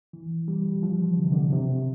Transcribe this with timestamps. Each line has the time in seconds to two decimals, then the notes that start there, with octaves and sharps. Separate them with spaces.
0.13 E3
0.48 G3
0.83 F3
1.17 D3
1.24 C3
1.32 D3
1.52 C3